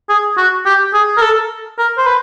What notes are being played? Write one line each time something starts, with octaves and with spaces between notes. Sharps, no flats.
G#4
F#4
G4
G#4
A#4
A4
A#4
C5
B4